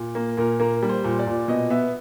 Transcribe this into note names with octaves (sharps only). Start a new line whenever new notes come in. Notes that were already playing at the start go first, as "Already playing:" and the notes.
Already playing: A#2
A#3
A#2 A#4
A#3 A#4
G3
C5
A#2
D5
A#2
B2 D#5
B3 E5